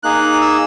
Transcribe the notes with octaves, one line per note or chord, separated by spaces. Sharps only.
A#3 D#4 G#4 F#6
E6